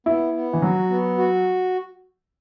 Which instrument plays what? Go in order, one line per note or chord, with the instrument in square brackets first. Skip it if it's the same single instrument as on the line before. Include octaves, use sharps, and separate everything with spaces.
[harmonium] B3 [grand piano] E4
[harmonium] B3
[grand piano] E3
[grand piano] F#3 [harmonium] F#4
[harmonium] B3
F#4